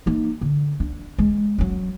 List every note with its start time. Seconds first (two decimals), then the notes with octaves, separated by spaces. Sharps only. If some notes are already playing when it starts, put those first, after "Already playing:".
0.06 A#3 D#4
0.41 D3
0.80 D4
1.19 G#3
1.58 F#3 C#4